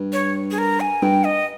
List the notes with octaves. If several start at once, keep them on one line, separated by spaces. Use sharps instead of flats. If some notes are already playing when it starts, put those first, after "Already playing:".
Already playing: G2
C#5
G#4
A#4
G#5
G2 G5
D#5